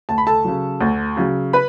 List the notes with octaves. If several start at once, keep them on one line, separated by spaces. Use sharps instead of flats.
D2 A5
B5
A4 A5
C#3 F#3
D2
C#3 F#3
B4 B5